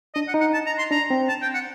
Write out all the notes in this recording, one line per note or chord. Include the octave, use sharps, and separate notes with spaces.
D4 D#5
F#5
D#4
F#5
A5
A#5
C6
D4 A#5
C4
A5
G5
F#5